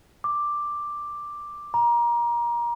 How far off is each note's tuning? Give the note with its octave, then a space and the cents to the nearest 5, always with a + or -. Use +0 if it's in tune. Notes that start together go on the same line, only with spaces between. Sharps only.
D6 +5
A#5 +25